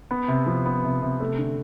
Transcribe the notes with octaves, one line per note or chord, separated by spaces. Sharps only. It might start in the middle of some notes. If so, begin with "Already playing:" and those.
B3
C3
F3
B3
C3
C3
A3
D3